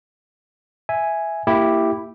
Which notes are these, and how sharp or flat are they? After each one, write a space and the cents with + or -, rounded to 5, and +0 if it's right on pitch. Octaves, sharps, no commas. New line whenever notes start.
E5 +0 G#5 +0
A#3 -20 E4 +0 G4 +0